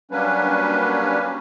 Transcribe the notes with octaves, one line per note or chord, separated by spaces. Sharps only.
F#3 G3 A#3 C#4 D4 B4